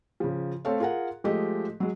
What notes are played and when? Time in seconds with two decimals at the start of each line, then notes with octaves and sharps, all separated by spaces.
0.20 C#3 F3
0.65 A3 C4 A4 C#5 F5
0.80 F4 G#4 A#4 F#5
1.24 F3 G#3 A3 G4 D#5
1.80 F#3 G#3